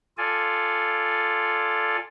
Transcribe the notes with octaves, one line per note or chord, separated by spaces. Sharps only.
F4 A4 D5 G#5